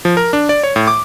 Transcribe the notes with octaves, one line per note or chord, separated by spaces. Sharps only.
F3
A#4
D4
D5
C#5
A2
D6